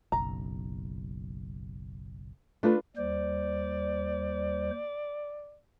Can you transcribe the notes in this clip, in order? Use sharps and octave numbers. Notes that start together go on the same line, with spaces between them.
F#1 B1 A#5
A3 D4 F4 B4
D#2 G3 C5 D5